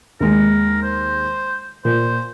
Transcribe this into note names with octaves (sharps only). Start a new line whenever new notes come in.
D#2 G#3 A#4
C5
A#2 C5